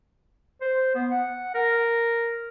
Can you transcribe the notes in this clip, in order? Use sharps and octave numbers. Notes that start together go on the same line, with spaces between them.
C5
B3
F#5
A#4